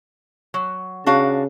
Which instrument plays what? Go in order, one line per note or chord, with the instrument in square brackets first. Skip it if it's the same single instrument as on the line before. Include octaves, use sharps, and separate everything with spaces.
[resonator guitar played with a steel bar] F#3
[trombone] C#3 [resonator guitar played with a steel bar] D4 F#4 F5